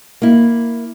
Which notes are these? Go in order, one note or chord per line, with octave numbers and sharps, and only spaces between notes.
A#3 E4